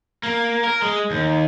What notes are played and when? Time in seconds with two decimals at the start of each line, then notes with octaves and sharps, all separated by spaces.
0.23 A#3
0.64 A#4
0.82 G#3
1.11 D#2